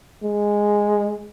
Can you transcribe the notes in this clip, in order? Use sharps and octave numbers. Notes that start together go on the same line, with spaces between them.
G#3